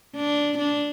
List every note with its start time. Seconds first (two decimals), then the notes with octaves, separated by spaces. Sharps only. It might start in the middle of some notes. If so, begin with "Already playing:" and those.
0.16 D4
0.59 D4